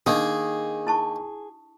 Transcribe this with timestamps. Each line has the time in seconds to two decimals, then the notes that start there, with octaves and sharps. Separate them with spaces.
0.06 D#3 A#3 D4 D#4 G#4
0.87 E4 A5 C#6